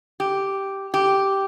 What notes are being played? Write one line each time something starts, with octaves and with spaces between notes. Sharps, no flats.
G4
G4